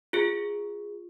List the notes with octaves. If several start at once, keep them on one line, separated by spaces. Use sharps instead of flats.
F4 G#4